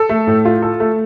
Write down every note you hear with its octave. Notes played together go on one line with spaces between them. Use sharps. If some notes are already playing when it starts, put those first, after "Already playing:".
Already playing: A4
A3
A2
F4
A4
A3